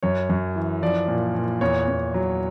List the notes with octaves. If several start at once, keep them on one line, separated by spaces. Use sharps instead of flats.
F#2 C#5
F#2
E3
F3 D5
A#2
A#2
E2 C#5
E2
F#3